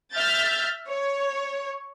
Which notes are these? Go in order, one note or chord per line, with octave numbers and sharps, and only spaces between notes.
E5 F6 G6 A6
C#5